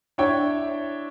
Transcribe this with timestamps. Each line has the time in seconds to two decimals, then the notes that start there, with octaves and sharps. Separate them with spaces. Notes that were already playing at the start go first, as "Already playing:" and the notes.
0.18 D4 E4 C#5 G5